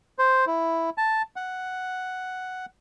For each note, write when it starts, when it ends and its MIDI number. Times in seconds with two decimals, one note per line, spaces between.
0.19 0.45 72
0.47 0.90 64
0.98 1.22 81
1.36 2.66 78